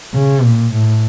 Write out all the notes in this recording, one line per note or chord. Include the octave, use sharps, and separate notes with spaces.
C#3
A#2
A2